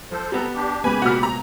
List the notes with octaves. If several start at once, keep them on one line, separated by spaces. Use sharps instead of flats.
F3 A4 C5
G3 B3 C4 A4 A#5
D4 G4
C#3 G#3 A#3 B3 G4 B4 G#5 B5
C2 A#2 F#4 F6
A#5